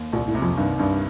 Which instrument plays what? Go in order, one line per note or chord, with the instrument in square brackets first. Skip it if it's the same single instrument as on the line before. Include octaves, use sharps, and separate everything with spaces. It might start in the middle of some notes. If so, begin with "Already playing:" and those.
Already playing: [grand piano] D#2
[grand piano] C2 [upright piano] A#2
[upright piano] A2
[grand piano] C3
[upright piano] F2
[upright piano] G2 [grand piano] D#3
[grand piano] C2 [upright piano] G2